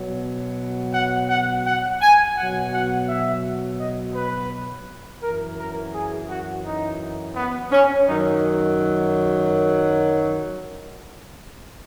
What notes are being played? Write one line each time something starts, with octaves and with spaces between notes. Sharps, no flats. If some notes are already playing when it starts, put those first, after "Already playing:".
Already playing: B2 F#3
F#5
F#5
F#5
G#5
B2 F#3 F#5
F#5
E5
D#5
B4
F#2 E3 A#4
A#4
G#4
F#4
D#4
B3
C#4
F#2 D#3 F#3 D#4